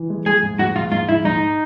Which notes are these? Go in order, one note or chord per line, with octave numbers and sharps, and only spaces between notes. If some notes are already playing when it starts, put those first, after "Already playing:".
Already playing: E3
G#3
G#3 G#4
G#2
G#2 F#4
G#2 F4
G#2 F4
G#2 E4
G#2 D#4